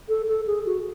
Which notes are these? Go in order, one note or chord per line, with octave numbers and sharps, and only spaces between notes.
A4
A4
G#4
F#4